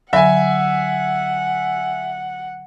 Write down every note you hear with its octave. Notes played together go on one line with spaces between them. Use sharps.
D3 F#3 E5 F#5 G#5 B5